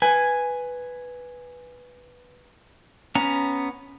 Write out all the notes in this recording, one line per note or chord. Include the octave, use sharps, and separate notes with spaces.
B4 G#5
B3 C#4 A#5